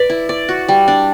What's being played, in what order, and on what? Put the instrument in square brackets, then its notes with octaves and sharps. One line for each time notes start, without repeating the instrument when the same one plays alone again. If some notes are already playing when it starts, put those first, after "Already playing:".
Already playing: [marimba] B4 [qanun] D5
[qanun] E4
D5
F#4
G3
D4